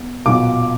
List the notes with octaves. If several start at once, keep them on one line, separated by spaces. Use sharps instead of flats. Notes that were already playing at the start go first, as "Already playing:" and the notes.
Already playing: B3
B1 A#2 F#3 B3 D6